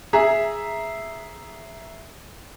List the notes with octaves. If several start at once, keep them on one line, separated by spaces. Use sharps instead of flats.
G#4 E5 A#5